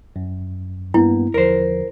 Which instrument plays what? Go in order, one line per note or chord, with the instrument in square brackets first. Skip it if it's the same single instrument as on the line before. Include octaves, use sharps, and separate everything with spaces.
[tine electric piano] F#2
[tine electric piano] G2 A#3 B3 [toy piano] E4
[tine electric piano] E2 D3 F3 [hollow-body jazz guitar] A#4 C5